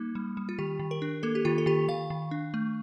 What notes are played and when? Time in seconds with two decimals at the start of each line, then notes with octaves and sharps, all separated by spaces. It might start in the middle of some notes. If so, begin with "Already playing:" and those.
Already playing: G3 A#3 D#4
0.15 G3
0.37 G3
0.49 F4
0.59 D#3 G4
0.79 D#3
0.91 A#4
1.02 D4
1.23 A#3 A4
1.35 G4
1.45 D#3 F4
1.58 A4
1.66 D#3 G4
1.88 D#3 F5
2.10 D#3
2.31 D4
2.54 A3